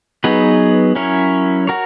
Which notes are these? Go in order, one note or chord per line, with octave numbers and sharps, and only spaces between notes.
F#3 B3 D#4 G#4 B4
F#3 C#4 E4 A#4 C#5
F#4 A#4 C#5